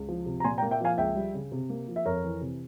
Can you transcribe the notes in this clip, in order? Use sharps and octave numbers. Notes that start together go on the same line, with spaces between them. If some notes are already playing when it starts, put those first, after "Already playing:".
Already playing: C#2
F3
C3
A#5
A#2 G#5 C6
G5 A#5
A#3
E5 G5
F3 F5 G#5
C#2 E5 G5
G3
C#3
C3
A#3
F3
E5
F2 A#4 C#5
E3
C3